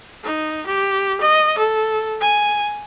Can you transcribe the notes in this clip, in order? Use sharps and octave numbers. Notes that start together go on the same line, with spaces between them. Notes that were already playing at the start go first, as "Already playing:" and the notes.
D#4
G4
D#5
A4
G#5